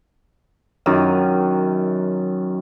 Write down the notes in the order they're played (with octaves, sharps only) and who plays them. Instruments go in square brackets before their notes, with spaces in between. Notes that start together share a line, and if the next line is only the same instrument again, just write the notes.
[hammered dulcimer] F#2 D#3